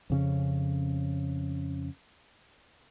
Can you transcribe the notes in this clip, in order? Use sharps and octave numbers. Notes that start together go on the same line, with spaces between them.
F2 C#3 C#4